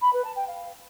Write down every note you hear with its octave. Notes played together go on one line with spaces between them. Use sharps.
B5
B4
A5
G5
F5